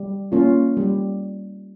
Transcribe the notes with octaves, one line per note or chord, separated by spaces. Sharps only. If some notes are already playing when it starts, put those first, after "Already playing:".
Already playing: G3
A#3 C#4 F4
G3